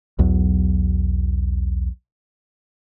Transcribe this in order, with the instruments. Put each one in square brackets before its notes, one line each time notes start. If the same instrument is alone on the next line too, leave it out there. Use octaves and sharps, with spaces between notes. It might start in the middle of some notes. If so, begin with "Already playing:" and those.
[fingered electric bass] B1 E2 F#3